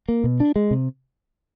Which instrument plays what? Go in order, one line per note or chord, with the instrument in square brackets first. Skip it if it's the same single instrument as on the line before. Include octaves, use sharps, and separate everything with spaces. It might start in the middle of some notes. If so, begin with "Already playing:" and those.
[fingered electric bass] A#3
B2
D4
G#3
C3